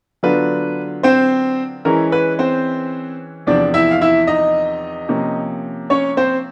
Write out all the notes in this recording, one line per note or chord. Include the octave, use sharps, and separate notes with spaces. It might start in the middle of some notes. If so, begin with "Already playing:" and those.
D3 F#3 B3 D4 F4 B4
C4 C5
E3 G#3 C#4 E4 A#4
B4
C4 C5
E2 C3 F3 D4 D5
E4 E5
F5
E4 E5
D#4 D#5
C3 F3 A#3 C#4
C#4 C#5
C4 C5